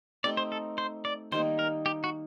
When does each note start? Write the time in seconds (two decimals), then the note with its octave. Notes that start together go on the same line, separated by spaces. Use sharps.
0.24 A3 C4 D#4 G4 D5
0.37 C5
0.52 A4
0.78 C5
1.05 D5
1.32 D#3 G3 A#3 D#4 C5
1.59 A#4
1.86 G4
2.04 F#4